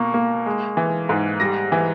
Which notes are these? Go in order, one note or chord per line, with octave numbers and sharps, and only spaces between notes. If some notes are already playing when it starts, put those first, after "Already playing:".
Already playing: B2 A#3 C#6
A#3
G#3
E3
G#2
G3 A#6
E3